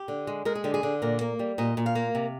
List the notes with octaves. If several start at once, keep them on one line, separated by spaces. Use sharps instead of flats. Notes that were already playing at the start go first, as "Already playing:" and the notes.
Already playing: G4
D3
G#3
G#3 A#4
G#4
D3 G4
G#4
D3
A#2 A#4
A#3
G3
A#2 D#5
A#2
F5
A#3
C3